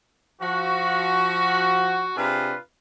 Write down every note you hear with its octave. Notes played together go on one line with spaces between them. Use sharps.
F3 F#4
C3 D4 F4 G#4 B4